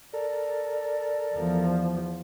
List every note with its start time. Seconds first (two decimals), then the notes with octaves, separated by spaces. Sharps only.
0.13 A4 A#4 D5
1.34 E2 F3